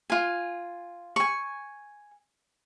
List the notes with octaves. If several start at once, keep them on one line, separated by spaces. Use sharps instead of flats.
F4 G#5
G#5 C#6